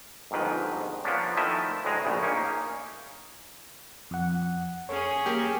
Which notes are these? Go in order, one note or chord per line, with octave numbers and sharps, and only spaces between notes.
G1 F2 G#2 D#3 B4
F3 A#3 B3 C#4 D4
D#3 F3 A3 E4 D#5 E5
D2 A2 G#3 G#4 A#5
A#1 A2 C#3
A#3 C#4 D#4
F2 F#5
C#4 G#4 C#5
A#3 G4 A#4 A5